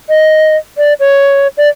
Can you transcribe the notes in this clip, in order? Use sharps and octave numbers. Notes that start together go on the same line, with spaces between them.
D#5
D5
C#5
D5